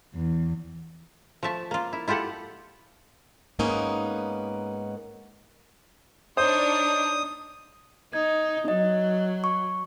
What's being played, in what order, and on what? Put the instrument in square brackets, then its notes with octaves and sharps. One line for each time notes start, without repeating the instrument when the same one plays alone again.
[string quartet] E2
[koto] F3 A3 E5 A5
A#3 F4
E4
E4 F4 G4 A4 F#5
[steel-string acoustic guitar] G#2 A#3 B3 C#4 D#4
[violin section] D4 D#4 C#5 [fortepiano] C5 [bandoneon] D#6
[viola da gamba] D#4 [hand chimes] G#6
[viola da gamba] F#3 [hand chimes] D#5
[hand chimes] C#6